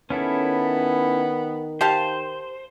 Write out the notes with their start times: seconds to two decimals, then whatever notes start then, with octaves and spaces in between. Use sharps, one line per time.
0.10 D#3 B3 C#4 E4 A4
1.81 G4 C5 F5 A5